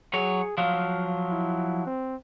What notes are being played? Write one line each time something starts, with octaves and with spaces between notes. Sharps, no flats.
F#3 G#4 C#5
F3 F#3 F5
E4
C4